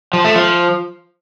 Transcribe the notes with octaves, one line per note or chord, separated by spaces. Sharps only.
F3
A3
F3